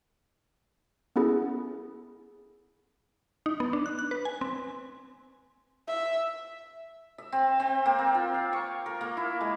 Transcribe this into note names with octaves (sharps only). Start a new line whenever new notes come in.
B3 C#4 E4 G#4 A4
D#4
B3
D4
F#6
F#6
B4
G#5
C4
E5
E5
C4
C4
A#3
A#3
F4
F5
C#6
A#4
A#3
E4
G#3